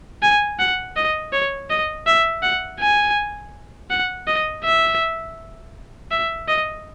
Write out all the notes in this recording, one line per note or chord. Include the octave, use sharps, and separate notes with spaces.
G#5
F#5
D#5
C#5
D#5
E5
F#5
G#5
F#5
D#5
E5
E5
D#5